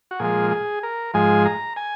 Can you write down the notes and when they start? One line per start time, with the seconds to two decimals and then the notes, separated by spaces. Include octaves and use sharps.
0.11 F#4
0.19 A#2 F3 G#3 G#4
0.51 G#4
0.83 A#4
1.14 G#2 F3 G#3 G#5
1.45 A#5
1.76 G#5